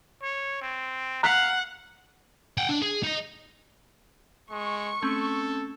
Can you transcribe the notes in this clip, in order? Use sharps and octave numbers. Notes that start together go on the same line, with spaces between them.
C#5
C4
F5 F#5 A#5 F#6 B6
F#5 G5
D4
G#4
D#4 D#5
G#3 C#6
A3 C4 C#4 A4